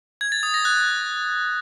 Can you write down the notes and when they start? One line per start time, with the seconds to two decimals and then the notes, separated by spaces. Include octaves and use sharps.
0.21 G#6
0.32 A6
0.43 D#6
0.54 A#6
0.65 F#6